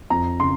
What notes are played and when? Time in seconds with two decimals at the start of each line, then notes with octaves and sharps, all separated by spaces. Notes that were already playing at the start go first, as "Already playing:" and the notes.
0.10 F2 A#5
0.40 C#3 C6